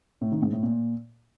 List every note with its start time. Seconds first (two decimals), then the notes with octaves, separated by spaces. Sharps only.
0.21 A2
0.32 D#3
0.42 G#2
0.52 A2
0.63 A#2